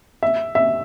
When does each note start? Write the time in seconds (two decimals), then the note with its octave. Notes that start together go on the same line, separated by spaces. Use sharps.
0.23 E5
0.55 E5